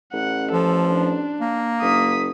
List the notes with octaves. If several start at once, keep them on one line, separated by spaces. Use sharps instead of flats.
A1 F#5
F3 A4
D4
A#3
F#1 D#6 B6